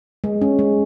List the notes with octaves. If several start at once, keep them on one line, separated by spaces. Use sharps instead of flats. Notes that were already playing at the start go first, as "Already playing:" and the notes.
G#3
C#4
G#3